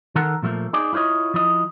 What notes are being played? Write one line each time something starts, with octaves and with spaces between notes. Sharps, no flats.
D#3 A4 A#4 F#5
A#2 F3 A3 A#3
D#4 G#4 D5
E4 F4 C5 C#5 D#5
F3 E4 D#5